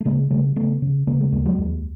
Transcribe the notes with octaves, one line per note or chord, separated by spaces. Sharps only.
A3
C#3 G#3 A#3
C#3 G3 A3
C#3 A3 B3
C#3
C#3 G#3 A#3
G#3 A#3
D#2 G#3 A#3
F#3 G#3
D#2